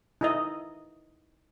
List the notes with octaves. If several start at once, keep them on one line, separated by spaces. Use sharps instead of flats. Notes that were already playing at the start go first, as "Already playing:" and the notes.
D#4 E4 D#5